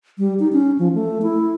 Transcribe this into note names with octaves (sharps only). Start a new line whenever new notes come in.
G3
D#4
C#4
F3
A3
E4